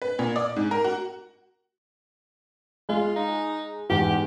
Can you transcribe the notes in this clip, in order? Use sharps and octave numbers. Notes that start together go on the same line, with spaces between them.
B4
A#2
D5
G#2
A#4
F#4
G#3 F4
D#4
E2 G#2 G4